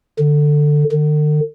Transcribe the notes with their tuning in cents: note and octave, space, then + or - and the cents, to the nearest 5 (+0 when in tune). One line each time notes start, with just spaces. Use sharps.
D3 +10
D3 +45